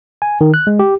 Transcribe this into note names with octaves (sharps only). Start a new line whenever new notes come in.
G#5
D#3
F#6
G#3
G4